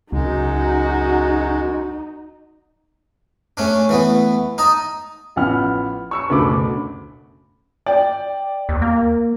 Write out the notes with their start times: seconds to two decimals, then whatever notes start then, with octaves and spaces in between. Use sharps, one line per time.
0.12 C#2 F#2 G#3 D#4 F#4
3.57 A3 C#4 D4
3.89 E3 A3 B3
4.58 D#4 D#5 A5
5.36 A1 F3 B3 F#5 F6
6.11 C#6 E6 C#7
6.29 F#1 D2 B2 A3 B5 D6
7.86 D5 G5
8.69 D#2
8.82 A#3